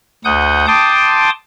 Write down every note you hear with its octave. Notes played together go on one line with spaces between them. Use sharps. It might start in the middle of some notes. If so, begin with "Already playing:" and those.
D2 F#5 D#6 G6
G5 A5 C6 D6 D#6